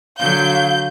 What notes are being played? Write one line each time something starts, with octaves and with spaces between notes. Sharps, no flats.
D3 F#3 F5 G6